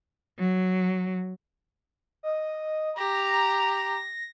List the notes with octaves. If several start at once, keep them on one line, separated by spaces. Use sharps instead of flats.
F#3
D#5
G4 A#5 A#6